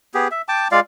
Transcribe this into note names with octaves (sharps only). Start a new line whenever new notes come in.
B3 G4 G#4
E5
G5 A5 D6
G#3 F4 D5 F5